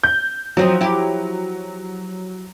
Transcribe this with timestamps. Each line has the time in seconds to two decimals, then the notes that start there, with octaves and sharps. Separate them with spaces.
0.03 G6
0.57 F3 F#3 C4 D#4
0.81 E4 G4